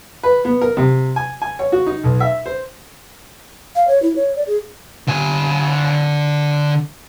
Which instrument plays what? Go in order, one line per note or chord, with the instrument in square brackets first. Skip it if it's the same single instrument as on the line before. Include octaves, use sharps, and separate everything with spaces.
[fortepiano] B4
B3
A#4
C3
G#5
G#5
C#5
F#4
D#4
B1
E5
C5
[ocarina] F5
C#5
E4
C#5
D5
G#4
[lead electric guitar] D3 G#5